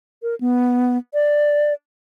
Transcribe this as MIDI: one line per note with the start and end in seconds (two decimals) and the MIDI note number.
0.22 0.35 70
0.41 0.97 59
1.14 1.73 74